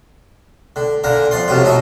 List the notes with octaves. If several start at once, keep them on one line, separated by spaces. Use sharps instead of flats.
D3
A#2 D3 A#4
F2 D5 C6
F2 C3 F#3 F4
B2 D#4 E5